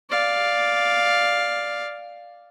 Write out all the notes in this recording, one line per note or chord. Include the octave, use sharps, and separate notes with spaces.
D5 F5